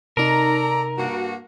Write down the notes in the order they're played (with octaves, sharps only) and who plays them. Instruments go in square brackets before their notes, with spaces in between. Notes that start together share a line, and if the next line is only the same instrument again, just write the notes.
[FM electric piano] C3 D#4 [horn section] A4 D5 A#5 [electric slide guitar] A#4
[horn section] G2 A#3 F#4